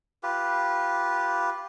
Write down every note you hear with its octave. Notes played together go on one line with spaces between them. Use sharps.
F4 G4 B4